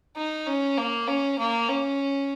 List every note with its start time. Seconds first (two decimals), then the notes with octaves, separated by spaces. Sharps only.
0.16 D#4
0.47 C#4
0.78 A#3
1.07 C#4
1.38 A#3
1.68 C#4